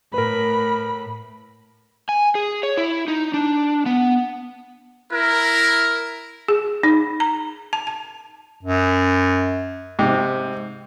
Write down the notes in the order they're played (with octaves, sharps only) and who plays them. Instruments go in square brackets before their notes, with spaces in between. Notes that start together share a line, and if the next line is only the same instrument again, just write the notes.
[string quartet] A2 [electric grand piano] A#4 B4 [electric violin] B5
[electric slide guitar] G#5
G#4
C#5
E4
D#4
D4
B3
[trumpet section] E4 A#4
[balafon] G#4
D#4
A#5
A5
A5
[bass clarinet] F#2
[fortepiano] G#2 C3